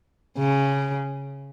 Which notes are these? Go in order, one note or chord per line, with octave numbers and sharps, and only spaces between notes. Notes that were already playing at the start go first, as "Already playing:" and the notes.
C#3